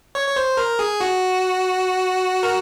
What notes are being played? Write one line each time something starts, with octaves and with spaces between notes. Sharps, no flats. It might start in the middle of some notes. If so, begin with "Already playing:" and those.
C#5
C#5
C5
A#4
G#4
F#4
A#4